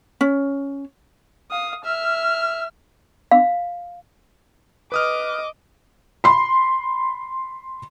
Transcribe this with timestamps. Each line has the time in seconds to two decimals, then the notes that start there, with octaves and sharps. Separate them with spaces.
0.21 C#4
1.51 F5 D#6
1.85 E5 F6
3.31 F5
4.92 B4 D#5 D6 D#6 F6
6.24 B5 C6